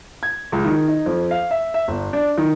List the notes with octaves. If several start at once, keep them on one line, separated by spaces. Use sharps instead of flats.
G#6
C#2
D#3
D#4
F2
F5
E5
E5
G1
D4
D#3